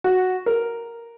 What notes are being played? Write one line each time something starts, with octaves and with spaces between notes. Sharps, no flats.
F#4
A#4